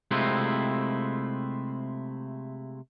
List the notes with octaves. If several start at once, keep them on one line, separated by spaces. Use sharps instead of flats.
C3 G#3 A3 C4 E4 F4